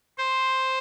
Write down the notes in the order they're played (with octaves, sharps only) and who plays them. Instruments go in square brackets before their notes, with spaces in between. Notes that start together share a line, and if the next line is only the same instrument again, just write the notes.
[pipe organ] C5